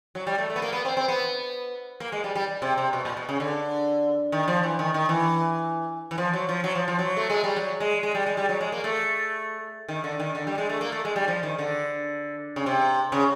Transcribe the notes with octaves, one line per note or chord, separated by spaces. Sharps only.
F#3
G3
A3
A3
B3
A#3
B3
C4
C4
B3
A#3
G#3
G3
G3
C3
C3
B2
A#2
B2
C#3
D3
D#3
F3
E3
D#3
D#3
E3
E3
F3
F#3
F3
F#3
F3
F3
F#3
A3
G#3
G3
F#3
G#3
G#3
G3
G#3
G3
F#3
G#3
A#3
A3
D#3
D3
D#3
D3
G3
G#3
A3
A#3
A3
G#3
G3
F3
D#3
D3
C#3
C3
C#3